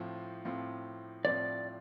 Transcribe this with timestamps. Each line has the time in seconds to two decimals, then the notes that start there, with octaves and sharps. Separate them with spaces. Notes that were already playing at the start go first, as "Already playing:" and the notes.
Already playing: A2 F3 C4 F4
0.45 A2 F3 C4 F4
1.25 A2 F3 C4 F4 D5